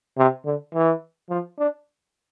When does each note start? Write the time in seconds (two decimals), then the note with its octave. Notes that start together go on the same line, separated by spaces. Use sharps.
0.18 C3
0.46 D3
0.74 E3
1.30 F3
1.59 D4